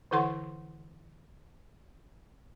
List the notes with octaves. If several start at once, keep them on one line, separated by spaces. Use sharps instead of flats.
D3 E3 E4 A4 F#5 C6